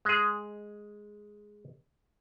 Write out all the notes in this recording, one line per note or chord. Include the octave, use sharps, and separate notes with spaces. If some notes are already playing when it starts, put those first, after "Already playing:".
G#3 G#4